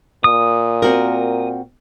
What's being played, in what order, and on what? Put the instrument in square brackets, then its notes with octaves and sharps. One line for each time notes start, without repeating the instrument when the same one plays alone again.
[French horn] A#2 [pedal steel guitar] D#6
[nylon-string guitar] C4 F#4 A#4